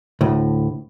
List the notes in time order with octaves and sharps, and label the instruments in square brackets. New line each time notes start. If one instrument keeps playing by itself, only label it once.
[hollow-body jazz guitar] D2 A2